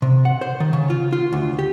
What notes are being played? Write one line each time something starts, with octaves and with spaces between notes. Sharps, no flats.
C3
F#5
C5
D#3
C#3
F4
F4
D2
G4